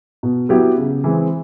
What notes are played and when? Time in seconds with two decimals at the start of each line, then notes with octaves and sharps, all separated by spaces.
0.23 B2
0.49 F#3 B3 E4 G4
0.77 C#3
1.04 E3 G#3 C4